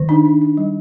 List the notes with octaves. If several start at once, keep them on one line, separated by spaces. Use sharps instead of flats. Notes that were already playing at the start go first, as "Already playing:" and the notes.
Already playing: D#3
D4 D#4
D4
D4
G3